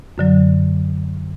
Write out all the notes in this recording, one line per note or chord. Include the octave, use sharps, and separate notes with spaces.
F#2 D3 F#3